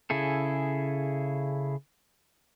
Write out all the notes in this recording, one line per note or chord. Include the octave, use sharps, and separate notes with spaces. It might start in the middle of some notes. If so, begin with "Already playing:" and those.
C#3 E4 G#4 A4